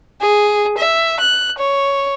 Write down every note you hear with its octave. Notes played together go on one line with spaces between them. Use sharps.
G#4
E5
F#6
C#5